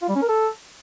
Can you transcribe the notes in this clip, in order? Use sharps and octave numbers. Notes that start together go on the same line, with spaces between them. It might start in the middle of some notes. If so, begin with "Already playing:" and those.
F4
G3
C#4
A#4
A4